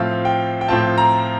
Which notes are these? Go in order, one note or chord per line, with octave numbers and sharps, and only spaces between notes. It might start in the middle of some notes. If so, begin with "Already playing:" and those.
Already playing: A2 F3 C4 F4 F5
G5
G5
A2 F3 C4 F4 A5
A#5